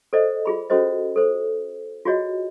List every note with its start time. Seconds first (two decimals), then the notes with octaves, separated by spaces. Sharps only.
0.13 A4 C5 D5 D#5
0.45 F4 G#4 B5
0.70 C#4 F#4 A4 C5 D#5
1.16 A4 C5
2.05 F4 F#4 G#4 C#5 D#5